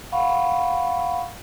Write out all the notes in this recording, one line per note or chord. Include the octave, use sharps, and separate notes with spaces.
F5 F#5 B5 C#6